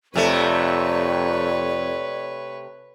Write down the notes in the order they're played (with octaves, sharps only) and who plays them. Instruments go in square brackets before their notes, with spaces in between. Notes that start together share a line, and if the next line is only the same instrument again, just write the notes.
[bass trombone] F2 [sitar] C3 A3 [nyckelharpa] B4 C#5 [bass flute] D5